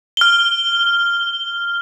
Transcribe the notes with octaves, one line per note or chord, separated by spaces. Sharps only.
F6 G7